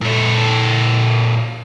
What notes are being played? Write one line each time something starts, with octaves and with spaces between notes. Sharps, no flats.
A#2 A4